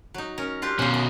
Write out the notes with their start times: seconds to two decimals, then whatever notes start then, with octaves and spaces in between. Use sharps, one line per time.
0.14 F#3 D#4
0.38 C#4 A#4
0.62 D4 F4 G4
0.79 B2 C#4 C5 F#5
0.94 D#5